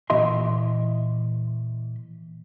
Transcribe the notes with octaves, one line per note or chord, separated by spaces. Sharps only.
A#2 E3 D#5 E5 C6